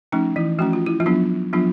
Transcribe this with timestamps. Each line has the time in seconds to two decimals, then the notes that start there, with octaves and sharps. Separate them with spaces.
0.12 F3 A3 C#4 D#4
0.36 E3 E4
0.59 F3 A3 C#4 F#4
0.73 F4
0.86 E4
1.00 F3 F4
1.06 F#3 B3 D4
1.53 F3 F#3 B3 D4 F4